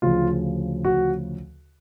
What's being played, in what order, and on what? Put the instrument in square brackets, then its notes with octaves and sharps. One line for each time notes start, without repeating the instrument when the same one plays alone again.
[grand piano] D2 C#3 F3 F4
F#4